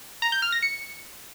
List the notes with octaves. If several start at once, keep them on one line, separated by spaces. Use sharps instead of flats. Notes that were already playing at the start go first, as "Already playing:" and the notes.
A#5
G6
F6
A#6
C#7